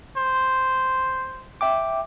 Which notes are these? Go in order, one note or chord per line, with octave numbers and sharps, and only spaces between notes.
C5
E5 G5 D6